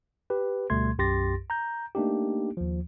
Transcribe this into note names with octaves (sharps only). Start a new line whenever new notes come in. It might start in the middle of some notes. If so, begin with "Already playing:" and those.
G4 B4
D2 B2 G3 A3 C6 G#6
B1 F#2 G4 C6 A6 A#6
A#5 G6
A3 A#3 D4 D#4 G4
D#2 F3